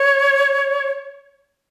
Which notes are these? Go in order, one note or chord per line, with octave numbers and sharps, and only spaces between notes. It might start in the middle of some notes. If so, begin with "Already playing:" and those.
Already playing: C#5